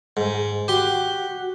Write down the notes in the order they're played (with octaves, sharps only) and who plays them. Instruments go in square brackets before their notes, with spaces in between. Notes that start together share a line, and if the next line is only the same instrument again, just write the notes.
[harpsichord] G#2
[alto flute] F#4 [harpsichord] G4 C6